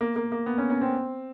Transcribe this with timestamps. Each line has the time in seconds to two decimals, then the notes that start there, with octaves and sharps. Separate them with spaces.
0.01 A#3
0.16 A#3
0.32 A#3
0.46 B3
0.58 C#4
0.70 C#4
0.81 C4